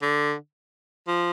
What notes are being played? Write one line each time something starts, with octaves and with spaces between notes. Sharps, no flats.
D3
F3